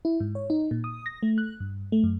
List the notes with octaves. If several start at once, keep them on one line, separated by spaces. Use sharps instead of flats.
E4
G#2
C#5
D#4
A#2
D#6
A#6
A3
F#6
G2
A3
F#2